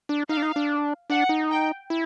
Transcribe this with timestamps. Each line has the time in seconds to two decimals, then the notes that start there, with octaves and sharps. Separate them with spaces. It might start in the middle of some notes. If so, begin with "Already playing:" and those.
0.09 D4
0.29 D#4 F5
0.37 D4
0.42 D#4
0.56 D4
1.10 D4 F#5
1.29 D#4
1.50 G5
1.90 E4